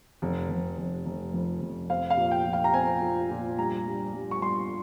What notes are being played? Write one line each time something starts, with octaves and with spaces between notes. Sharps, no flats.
F1
F1
F1
F1
F2
F1
C4 F5
F5
A#2
G5
F3
F5
A#5
C4 G#5
F3
A#2
G2 A#5
G2
G2
C#6
G2 C6